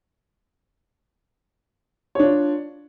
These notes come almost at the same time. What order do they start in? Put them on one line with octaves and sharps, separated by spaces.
C#5 D4 F4